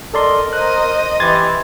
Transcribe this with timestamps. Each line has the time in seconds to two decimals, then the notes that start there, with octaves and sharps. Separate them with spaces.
0.14 A4 A#4 D5 D#5 C6
0.53 C5 D#5 F#6
1.20 E3 G4 C6 G#6 A6